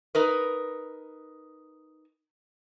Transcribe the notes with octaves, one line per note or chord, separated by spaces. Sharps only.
D#4 A#4 B4